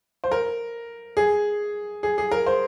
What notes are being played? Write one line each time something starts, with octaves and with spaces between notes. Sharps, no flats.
C5
A#4
G#4
G#4
G#4
A#4
C5